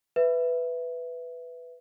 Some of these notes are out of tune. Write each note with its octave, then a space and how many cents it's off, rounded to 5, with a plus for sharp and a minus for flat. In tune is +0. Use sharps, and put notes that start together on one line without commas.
B4 +10 E5 +5